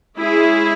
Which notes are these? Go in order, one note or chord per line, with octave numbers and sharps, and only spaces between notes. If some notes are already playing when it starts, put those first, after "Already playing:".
G#3 C#4 E4 G#4